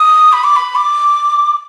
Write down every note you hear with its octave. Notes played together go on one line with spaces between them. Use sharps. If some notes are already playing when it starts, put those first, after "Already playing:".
Already playing: D#6
B5
D6
B5
D6